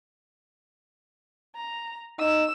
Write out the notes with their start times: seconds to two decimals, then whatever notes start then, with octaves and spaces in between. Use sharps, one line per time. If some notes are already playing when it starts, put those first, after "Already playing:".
1.56 A#5
2.19 D#4 E6